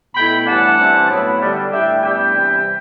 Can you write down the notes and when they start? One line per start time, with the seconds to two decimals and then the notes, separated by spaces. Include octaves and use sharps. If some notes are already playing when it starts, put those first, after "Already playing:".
0.15 B2 A3 E4 G5 B5
0.46 A2 E3 G3 D4 F#5 A5
0.78 G2 E3 G3 C4
1.09 A2 F#3 B3 E4
1.40 D3 G3 D4
1.71 A2 G3 D4 E5 G5
2.03 A2 G3 B3 D4 E5 G5
2.34 C3 E3 G3